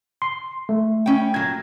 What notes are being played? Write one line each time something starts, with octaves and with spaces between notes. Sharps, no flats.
C6
A3
C#4 G5
A#2 F#3 G#6